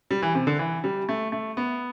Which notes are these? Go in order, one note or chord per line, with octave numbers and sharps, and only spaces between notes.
G3
E3
C3
D3
E3
G3
A3
A3
B3